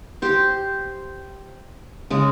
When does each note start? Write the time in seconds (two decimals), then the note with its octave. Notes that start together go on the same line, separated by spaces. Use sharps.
0.22 G4 C5
2.10 C#3 G#3